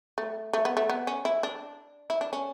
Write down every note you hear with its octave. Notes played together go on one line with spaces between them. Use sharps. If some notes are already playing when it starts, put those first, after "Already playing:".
A3
A3
B3
A3
B3
C#4
E4
D4
E4
D4
C#4